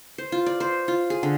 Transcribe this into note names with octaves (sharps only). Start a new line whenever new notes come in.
C5
F4
D5
C5
F4
G#4
D3